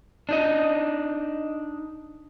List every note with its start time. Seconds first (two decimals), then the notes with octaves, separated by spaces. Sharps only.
0.29 D4 D#4 D#5